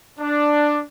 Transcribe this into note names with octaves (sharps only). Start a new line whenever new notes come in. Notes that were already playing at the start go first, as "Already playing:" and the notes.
D4